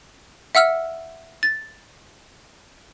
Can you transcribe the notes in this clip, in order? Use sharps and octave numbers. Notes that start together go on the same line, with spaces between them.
E5 F#5 E6 F6
A6